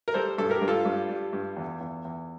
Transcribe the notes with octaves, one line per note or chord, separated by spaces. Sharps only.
A#4
G3 A4 C5
G2 A4
G4 A#4
G2
F4 A4
G2
G3
G2
E2
E2
E2